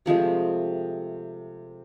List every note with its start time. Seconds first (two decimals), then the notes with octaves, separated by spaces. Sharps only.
0.06 C3 F3 G#3 A3